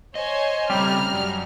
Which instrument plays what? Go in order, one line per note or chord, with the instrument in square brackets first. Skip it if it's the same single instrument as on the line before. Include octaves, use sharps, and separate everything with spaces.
[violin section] C5 C#5 G#5 [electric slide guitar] D#5
[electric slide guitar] C#3 A3 C4 [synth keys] G3 [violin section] A#5 F6
[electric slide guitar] F#2